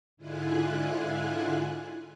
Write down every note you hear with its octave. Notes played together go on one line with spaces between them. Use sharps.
G#2 D3 E4 F4 G#5 F#6